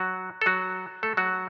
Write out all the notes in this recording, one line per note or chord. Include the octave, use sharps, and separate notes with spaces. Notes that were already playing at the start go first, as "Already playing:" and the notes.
Already playing: F#3 F#4
A4
F#3 F#4
A3 A4
F#3 F#4